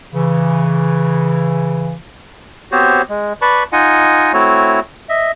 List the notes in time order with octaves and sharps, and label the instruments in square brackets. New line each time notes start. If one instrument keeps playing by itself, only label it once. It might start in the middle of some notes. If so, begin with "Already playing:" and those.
[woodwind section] C#3 E3
[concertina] B3 C4 F#4 G4 C5 C#5
G#3
B4 D5 A5 B5 C#6
D#4 F4 D#5 F#5 G#5
A3 C4 E4 F#4 C#5
D#5 E5